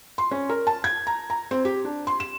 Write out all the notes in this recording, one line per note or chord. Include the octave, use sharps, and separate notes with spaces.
C6
C#4
A#4
A5
G#6
A#5
A#5
C4
G4
D4
C6
E7